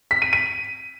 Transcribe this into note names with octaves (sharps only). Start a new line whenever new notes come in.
B6
D#7
D#7